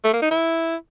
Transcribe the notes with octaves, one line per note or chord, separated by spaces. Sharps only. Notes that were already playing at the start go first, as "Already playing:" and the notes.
A3
A#3
D#4
E4